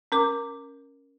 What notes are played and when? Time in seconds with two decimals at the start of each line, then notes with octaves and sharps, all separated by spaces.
0.12 C#4 A#4 D6